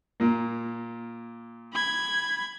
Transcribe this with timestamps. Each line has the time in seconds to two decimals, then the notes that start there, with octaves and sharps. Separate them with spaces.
0.20 A#2 A#3
1.73 B5 G#6